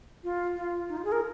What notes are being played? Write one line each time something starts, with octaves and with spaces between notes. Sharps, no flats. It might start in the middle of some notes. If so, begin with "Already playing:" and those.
F4
F4
D#4
F4
G#4
A#4